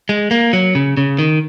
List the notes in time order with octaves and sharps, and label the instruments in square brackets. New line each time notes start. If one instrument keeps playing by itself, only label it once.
[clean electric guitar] G#3
A#3
F#3
C#3
C#3
D#3